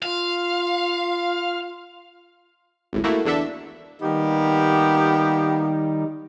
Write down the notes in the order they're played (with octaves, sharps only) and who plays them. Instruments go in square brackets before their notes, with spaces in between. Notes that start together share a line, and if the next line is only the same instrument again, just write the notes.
[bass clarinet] F4 [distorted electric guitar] F5
[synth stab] G#1 C#2 A2
A3 A#3 E4 F#4
E2 D3 D4 A4 E5
[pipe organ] D#3 G3 D#4 [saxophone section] A#3 B3 G4